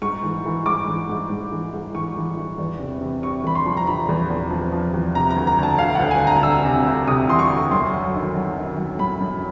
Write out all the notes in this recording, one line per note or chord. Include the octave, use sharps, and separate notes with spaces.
G#2 C#6
E3
E3
G#2 D6
E3
G#2
G#2
E3
G#2
E3 C#6
E3
E3
E2
C3
C3
C3 C#6
E2 B5
C6
F3
A#5
F3 B5
E2
E2
F3
F3
E2
C3 A#5
A#5
D2
A#5
D2 A5
D2 F5
D2 F#5
G#5
D2 A#5
D2 E6
C3
D2
C3 D#6
E3 C6
C#6
D2
F#2 C6
F#3
D#3
F#3
D#3
F#3
F#2 B5
F#2